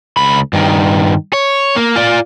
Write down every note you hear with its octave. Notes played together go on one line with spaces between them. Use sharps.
C#2 B5
G2 D#3
C#5
A#3
F4 D5